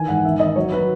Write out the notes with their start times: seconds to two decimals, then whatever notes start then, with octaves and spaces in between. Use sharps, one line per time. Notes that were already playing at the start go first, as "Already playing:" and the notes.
Already playing: D#3 E3 G#5
0.08 G#2 F#5
0.25 D#3 E5
0.40 D#3 D#5
0.56 F#3 C#5
0.72 F#3 B4